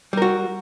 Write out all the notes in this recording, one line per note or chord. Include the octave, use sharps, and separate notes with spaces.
G3 F#4 A#4